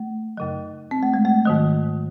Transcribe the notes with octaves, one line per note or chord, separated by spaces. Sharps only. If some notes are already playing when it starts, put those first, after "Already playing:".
Already playing: A3
F#2 C#3 F#3
C4
A3
G#3
A3
G#2 D#3 F#3